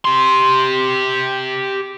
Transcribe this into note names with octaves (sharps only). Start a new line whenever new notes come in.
G4 C6